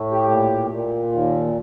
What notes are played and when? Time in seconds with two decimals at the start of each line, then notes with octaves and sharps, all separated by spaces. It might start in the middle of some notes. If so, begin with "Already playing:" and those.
Already playing: A2 A3
0.12 G4
0.32 A#2
0.73 A#2
1.13 D#2